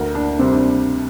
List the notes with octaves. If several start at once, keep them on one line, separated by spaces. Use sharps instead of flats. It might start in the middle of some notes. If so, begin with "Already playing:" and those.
Already playing: D2 A#4
D4
C3 G3 C4
D4